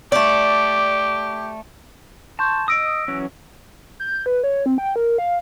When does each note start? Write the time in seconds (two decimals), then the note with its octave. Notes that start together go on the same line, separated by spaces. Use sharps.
0.12 A3 G4 D5
2.39 A5 C6 C#6 G6
2.68 D#5 D#6 E6 A#6 D7
3.08 E3 F#3 C#4
4.00 G6
4.26 B4
4.43 C#5
4.66 C4
4.78 G5
4.96 A#4
5.18 F5